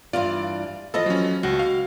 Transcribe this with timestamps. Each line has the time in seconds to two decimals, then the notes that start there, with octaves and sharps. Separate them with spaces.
0.13 G2 E3 F4 D5
0.94 E3 F3 A4 D#5
1.06 F#3 C#4
1.43 C#2 F#4
1.59 F5